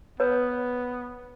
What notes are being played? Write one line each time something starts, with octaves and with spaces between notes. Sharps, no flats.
B3 B4 C#5